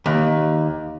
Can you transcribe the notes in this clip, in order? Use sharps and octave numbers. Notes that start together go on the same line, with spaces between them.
D#2